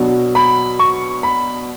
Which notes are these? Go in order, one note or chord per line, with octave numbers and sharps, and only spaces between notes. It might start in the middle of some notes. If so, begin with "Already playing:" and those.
Already playing: B2 F#3 B3 D4
B5
C#6
B5